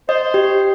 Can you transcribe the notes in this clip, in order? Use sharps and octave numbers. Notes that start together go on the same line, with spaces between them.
C5 D#5
G4